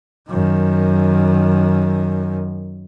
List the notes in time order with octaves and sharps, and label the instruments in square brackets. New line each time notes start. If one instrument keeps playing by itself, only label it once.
[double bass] F#2 D#3